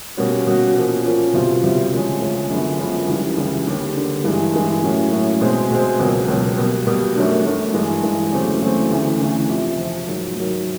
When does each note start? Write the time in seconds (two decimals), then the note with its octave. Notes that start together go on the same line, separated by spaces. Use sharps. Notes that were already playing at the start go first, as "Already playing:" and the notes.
0.17 B2 G3 A#3 C#4 F#4
0.47 B2 G3 A#3 C#4 F#4
0.75 A#2 F3 A#3 C#4
1.04 A#2 F3 A#3 C#4
1.33 C2 B2 G3 C4 F4
1.63 C2 B2 G3 C4 F4
1.92 D2 C#3 F3 G#3 C#4
2.21 D2 C#3 F3 G#3 C#4
2.49 F#2 D3 F3 G#3 B3
2.78 F#2 D3 F3 G#3 B3
3.07 C#2 C#3 E3 G3
3.37 C#2 C#3 E3 G3
3.66 D#2 D3 G3
3.96 D#2 D3 G3
4.24 G2 E3 G#3
4.54 G2 E3 G#3
4.83 A2 F#3 A#3 C#4
5.11 A2 F#3 A#3 C#4
5.40 B2 G#3 C4
5.71 B2 G#3 C4
5.99 C#2 B2 F#3 A#3
6.28 C#2 B2 F#3 A#3
6.58 B2 G3 A#3
6.87 B2 G3 A#3
7.16 F#2 D#3 F#3 A3 D4
7.45 F#2 D#3 F#3 A3 D4
7.74 G2 E3 G#3
8.03 G2 E3 G#3
8.32 E2 C#3 F#3 A3 C4
8.62 E2 C#3 F#3 A3 C4
8.90 D2 C#3 E3 A3 D4
9.20 D2 C#3 E3 A3 D4
9.49 F2 C3 F3
9.78 F2 C3 F3
10.07 G#2 D#3 F#3
10.36 G#2 D#3 F#3